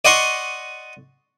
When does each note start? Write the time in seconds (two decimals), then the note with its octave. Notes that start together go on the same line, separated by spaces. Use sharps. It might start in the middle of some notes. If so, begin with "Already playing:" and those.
0.05 D5 D#5 F#5 C6 C#6